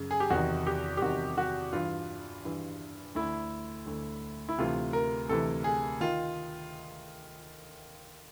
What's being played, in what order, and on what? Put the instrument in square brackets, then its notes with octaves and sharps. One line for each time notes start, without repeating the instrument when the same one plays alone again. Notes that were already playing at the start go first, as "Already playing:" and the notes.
Already playing: [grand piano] F#2 C#3
G#4
G4
E2 C3 D#3 F#4
G4
G4
E2 C3 D#3 F#4
F#4
G2 E3 F4
G2 E3
D2 D3 E4
D2 D3
E4
D2 C3 E3 F4
A#4
D2 C3 E3 A4
G#4
D#3 F4